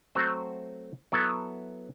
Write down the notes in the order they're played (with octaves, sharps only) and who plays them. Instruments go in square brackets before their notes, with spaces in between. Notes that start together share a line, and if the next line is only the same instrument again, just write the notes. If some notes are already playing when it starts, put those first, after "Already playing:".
[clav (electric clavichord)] F#3 A3 C4 F#4 C5
F#3 B3 E4 A4